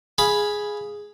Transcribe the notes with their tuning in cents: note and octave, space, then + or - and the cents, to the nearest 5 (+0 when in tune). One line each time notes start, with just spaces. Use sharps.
G#4 +0 F5 +0 B5 +0